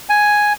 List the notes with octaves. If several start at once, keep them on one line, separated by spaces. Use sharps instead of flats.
G#5